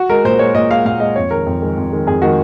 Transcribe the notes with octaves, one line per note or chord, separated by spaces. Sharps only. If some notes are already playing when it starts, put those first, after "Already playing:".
Already playing: F#4
G#3 A#4
A#2 C5
G#3 C#5
A#2 D#5
G#3 F5
A#2 F5
G#3 D#5
F2 C#5
D#3 G#3 A#4
F2
D#3 G#3
F2
D#3 G#3
F2 G#4
D#3 G#3 F#4